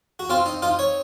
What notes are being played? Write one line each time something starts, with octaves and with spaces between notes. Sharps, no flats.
F#4
C4 F4
D#4
D#4 F4
C#5